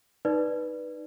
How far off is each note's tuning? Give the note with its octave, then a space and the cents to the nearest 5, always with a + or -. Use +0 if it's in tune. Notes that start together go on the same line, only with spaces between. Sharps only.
D#4 +0 B4 -10 D5 +0